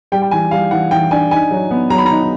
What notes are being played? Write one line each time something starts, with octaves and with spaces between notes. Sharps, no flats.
G3 G5
G5
E3 G#5
G3 F5
E3 F#5
E3 G5
D4 G#5
D#4 G#5
F#3
B3
F#3 A#5
B5
A#5
D#4